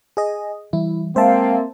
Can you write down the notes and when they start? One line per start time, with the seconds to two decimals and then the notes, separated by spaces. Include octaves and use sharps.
0.17 G#4 D#5
0.73 E3 G3 E4
1.16 G#3 A#3 C4 C5 E5 F5 G5 A5